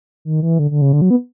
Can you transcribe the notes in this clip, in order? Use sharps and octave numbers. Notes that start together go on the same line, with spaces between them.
D#3
E3
D3
D3
C#3
D3
F#3
B3